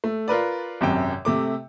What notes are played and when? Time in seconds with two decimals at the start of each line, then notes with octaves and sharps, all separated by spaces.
0.04 A3
0.28 F4 A#4 B4 D5
0.81 G#1 F#2 C3 G5
1.25 C3 A3 D6